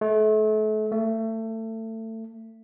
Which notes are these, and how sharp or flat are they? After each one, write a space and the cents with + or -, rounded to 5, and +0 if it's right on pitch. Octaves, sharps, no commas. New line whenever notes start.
A3 -35
A3 +25